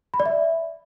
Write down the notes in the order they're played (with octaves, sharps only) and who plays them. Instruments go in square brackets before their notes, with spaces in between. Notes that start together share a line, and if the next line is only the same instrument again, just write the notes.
[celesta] B5
D5
E5